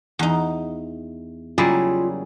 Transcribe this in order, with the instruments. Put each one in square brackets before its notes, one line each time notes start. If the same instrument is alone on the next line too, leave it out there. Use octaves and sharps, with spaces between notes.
[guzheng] E2 D#4
[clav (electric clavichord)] C#3 F#3 G3 [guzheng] A#3 [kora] E4 G#4 D5 [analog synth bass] F4